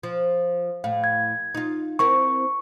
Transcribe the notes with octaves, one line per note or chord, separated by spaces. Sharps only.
F3
A2 F5
G#6
D#4 F4
C4 E4 A#4 C#6